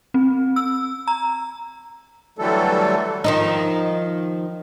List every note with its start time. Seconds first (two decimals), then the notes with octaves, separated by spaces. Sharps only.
0.14 C4
0.56 E6
1.08 A#5
2.39 D3 E3 F#3 G3 A3 A4
3.24 D#3 F3 D#4